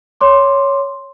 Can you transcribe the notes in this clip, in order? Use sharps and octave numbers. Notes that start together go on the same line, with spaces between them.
C#5 C6 D6